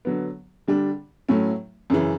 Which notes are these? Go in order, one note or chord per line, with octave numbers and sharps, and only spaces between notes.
D3 F#3 B3
D3 G3 D4
A2 F#3 A3 C#4 E4
F#2 C#3 E3